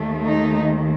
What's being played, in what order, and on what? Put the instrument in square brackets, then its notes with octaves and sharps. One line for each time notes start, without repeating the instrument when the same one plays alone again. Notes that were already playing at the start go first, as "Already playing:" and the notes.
Already playing: [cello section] D#2 D#3 A3
D#4